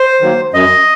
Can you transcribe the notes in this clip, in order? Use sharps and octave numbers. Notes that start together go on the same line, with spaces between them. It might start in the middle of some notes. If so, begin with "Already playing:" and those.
Already playing: C5
D#3 F#3 A#3
F#2 D#5